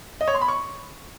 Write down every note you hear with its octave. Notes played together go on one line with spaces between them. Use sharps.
D#5
C#5
C6
B5
C#6